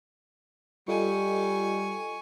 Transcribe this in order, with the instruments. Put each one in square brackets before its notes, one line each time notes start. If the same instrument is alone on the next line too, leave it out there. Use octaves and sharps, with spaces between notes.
[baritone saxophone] G3 [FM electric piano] F4 A4 D#5 [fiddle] G#5 C#6